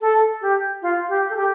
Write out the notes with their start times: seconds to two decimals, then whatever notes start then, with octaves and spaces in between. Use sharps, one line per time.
0.01 A4
0.41 G4
0.82 F4
1.09 G4
1.30 A4
1.36 G4